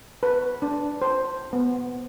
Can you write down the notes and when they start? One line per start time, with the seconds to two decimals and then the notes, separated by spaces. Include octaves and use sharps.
0.23 B4
0.62 D4
1.02 C5
1.53 B3